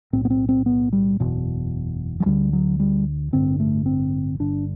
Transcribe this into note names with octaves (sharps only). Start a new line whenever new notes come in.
B1 A2 C4
B3
C4
C4
B3
G3
F#1 E2 B2
F#3
D2 D3 G3
F#3
G3
A1 G2 D3 C4
A3
C4
G1 G2 D3 D4